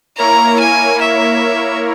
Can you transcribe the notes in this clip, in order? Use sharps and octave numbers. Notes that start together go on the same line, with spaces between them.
A#3 E4 A#4 C#5 A#5
G#5
E5